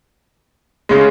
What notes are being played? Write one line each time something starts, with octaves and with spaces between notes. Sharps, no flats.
C#3 G#3